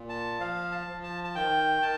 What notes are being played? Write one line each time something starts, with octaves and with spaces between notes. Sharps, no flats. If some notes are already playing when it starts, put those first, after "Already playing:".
Already playing: A#2
A5
F3 F5
A5
F3
A5
A5
D#3 G5
D#3 A5